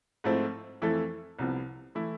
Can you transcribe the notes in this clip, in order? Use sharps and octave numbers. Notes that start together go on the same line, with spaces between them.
G#2 F3 A3 C4 E4
F2 E3 A3 E4 A4
C2 C3 F3 B3
E3 A3 E4